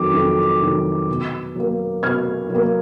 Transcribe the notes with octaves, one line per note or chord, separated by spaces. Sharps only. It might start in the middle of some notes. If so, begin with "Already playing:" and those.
Already playing: F2 D#3 F#3 D6
F2
D#3 F#3
B2
F#3 A#3
B2 F6 G#6
F#3 A#3